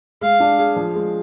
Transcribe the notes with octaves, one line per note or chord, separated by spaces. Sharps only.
G#3 F5
D4
G#4
F3
G#3